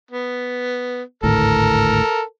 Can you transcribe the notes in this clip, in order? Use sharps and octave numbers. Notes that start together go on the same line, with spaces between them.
B3
G#1 D2 A2 A4 A#4